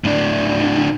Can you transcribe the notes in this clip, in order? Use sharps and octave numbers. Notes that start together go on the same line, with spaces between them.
A2 D4